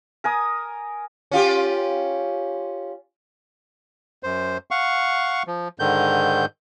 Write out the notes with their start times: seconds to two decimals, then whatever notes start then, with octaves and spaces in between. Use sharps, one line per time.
0.24 A#4 G#5 D#6
1.31 C#4 F4 G4
4.23 F#2 C5
4.71 F5 F#5 C#6
5.47 F3
5.79 G#2 D3 D#3 G6